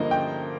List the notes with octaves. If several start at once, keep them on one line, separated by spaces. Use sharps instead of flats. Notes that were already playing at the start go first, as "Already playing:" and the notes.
Already playing: G2 D3 F3 A#3 D#5
G5